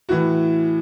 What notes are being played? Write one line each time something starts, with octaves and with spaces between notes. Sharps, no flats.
A2 E3 F#4